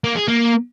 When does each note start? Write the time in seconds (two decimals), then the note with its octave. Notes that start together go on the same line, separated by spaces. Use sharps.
0.04 A#3
0.16 G#4
0.28 A#3